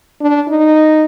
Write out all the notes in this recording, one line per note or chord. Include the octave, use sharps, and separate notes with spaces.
D4
D#4